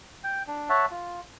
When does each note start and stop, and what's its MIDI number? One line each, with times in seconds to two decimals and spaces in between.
0.24 0.43 79
0.47 0.69 62
0.69 0.85 73
0.69 0.85 76
0.69 0.85 78
0.69 0.85 81
0.91 1.20 65